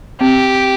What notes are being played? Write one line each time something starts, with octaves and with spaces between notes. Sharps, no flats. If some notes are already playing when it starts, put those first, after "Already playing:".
C4 G4